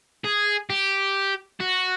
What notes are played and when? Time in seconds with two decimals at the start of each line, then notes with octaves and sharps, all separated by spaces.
0.24 G#4
0.70 G4
1.60 F#4